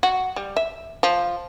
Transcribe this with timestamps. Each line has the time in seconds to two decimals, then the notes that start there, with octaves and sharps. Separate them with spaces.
0.03 F#4
0.36 G3
0.57 E5
1.03 F3